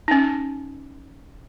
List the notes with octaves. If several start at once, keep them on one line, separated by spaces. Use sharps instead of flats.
C#4 D#4